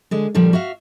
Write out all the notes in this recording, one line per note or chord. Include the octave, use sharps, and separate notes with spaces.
D3 G#3
A#2 D3 F3 G3
F#4 E5 F5